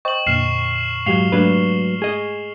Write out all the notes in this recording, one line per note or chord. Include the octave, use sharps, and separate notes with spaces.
C5 D#5 G5 C#6 F#7
F2 A#2 D3 F6 C7 E7
G#2 F#3 G4 F5 C7 F7 G7
G#2 F#3 G#3 A3 D4 B4
G#4 D#5